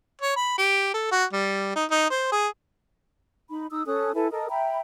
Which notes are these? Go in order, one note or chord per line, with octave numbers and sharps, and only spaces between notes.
C#5
B5
G4
A4
F#4
G3
D#4
D#4
C5
G#4
D#4 B5
D#4 D#6 E6
C#4 A4 D#6 F#6
E4 A4 B4 G#5
A4 A#4 D#5 D#6
E5 G5 A#5 B5